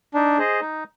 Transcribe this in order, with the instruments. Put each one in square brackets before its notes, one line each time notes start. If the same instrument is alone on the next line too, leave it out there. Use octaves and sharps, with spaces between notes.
[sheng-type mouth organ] D4 [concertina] D#4
[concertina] G#4 C5 D#5
D#4